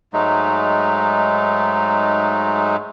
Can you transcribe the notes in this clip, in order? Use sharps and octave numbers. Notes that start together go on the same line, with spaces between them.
G#2 F#3 G#3 A3 D#4